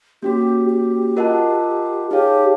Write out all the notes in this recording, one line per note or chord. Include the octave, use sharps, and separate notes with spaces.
A#3 C#4 F#4 G4
G4
F4 A#4 D#5 F#5 A5
D#4 G4 G#4 C#5 F5 A5